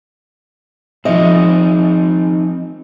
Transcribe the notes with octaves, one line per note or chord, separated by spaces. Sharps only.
F3 C4 D#4 G#4 D#5 E5